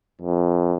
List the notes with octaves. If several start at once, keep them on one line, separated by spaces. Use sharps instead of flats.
F2